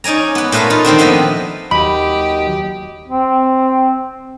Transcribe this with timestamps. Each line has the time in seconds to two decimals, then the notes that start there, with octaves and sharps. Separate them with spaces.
0.04 C#4 D#4 D5 G#5 A#5
0.35 B3 F#5
0.52 A#2 A3 B4 F5 A5 B5
0.70 D#4 F4
0.84 D#3 A#3 C4 D4
0.98 F3 B3 B4 D#5 E5
1.71 D#2 F#3 G4 D#5 B5
3.07 C4